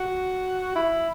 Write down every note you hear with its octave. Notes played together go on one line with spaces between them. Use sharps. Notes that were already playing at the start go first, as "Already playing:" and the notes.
Already playing: F#4
E4